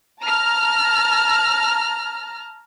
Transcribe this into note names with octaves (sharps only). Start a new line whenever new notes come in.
A5 A#5 F6